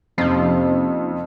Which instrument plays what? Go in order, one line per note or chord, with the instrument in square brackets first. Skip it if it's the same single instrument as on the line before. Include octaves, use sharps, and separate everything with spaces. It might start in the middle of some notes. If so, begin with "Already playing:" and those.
[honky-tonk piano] F2 [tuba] C3 [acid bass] F3 [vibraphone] A#3 C#4 D#4